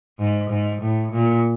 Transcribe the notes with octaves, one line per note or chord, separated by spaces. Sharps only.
G#2
G#2
A2
A#2